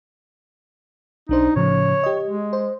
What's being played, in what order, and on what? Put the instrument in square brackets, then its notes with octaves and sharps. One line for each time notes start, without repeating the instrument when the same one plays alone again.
[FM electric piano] B1 D4 C5 [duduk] D#4
[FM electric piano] A2 C#3 F3 [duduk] C#5
[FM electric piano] G4 D#5
[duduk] G#3
[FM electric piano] C5